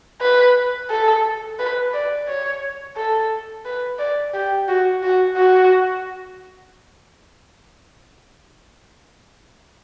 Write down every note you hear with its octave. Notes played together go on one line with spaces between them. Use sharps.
B4
A4
B4
D5
C#5
A4
B4
D5
G4
F#4
F#4
F#4